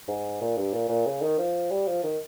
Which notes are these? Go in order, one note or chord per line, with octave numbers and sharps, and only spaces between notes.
G#2
A#2
G2
A#2
A#2
C#3
D#3
F3
G3
F3
D#3